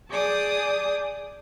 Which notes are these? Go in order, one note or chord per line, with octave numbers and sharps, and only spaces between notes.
G#4 D5 A5 D6 D#6 G6